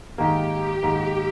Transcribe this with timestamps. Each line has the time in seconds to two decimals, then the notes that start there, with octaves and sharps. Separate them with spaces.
0.18 G#2 D#3 A#3 G4
0.83 G#2 D#3 A#3